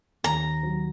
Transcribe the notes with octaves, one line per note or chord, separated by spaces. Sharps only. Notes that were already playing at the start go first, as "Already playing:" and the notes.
D#2 A#5
F#3